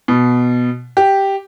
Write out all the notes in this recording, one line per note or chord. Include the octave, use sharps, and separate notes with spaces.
B2
G4